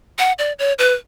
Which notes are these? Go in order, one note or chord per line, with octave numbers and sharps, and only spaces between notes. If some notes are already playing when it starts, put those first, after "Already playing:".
F#5
D5
C#5
B4